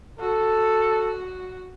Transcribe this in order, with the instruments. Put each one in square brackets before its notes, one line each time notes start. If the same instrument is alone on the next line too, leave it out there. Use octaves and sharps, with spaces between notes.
[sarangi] F#4 [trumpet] A4